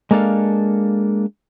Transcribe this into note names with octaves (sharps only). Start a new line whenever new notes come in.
G#3 A#3 D4 A4 F5